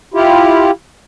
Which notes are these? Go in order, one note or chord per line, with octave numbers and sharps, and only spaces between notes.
E4 F4 G4